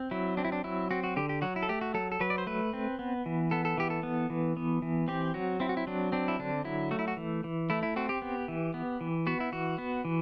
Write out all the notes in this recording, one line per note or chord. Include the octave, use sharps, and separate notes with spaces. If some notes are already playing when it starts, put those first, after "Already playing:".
Already playing: C4
F#3 E4
C4 D4
E4
D4
F#3 E4
C4 F#4
F#4
D3 G4
G4
F#3 F#4
E4
A4
A3 G4
F#4
F#3 A4
A4
F#3 B4
D5
C5
A3 B4
C4
B3
E3
B3 A4
A4
E3 G4
A4
B3
E3
B3
E3
C4 G4
F#3 F#4
C4 E4
F#4
E4
F#3 D4
C4 D4
E4
D3 D4
F#3 E4
A3 F#4
E4
F#4
E3
E3
A3 E4
E4
C4 F#4
G4
B3
E3
B3
E3
B3 F#4
E4
E3 F#4
B3
E3